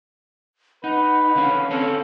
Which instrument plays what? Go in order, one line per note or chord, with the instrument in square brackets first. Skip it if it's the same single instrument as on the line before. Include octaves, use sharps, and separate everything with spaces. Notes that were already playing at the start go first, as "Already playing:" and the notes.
[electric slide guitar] D#4 [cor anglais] B4 [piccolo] F#5
[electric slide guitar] D3 C#4 [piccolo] F5
[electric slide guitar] C4 C#4 C#5 [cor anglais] A4